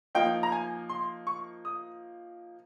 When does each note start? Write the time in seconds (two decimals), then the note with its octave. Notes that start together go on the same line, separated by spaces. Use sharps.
0.15 F3 A#3 D#4 G5
0.43 A#5
0.52 G#5
0.89 C6
1.27 C#6
1.65 D#6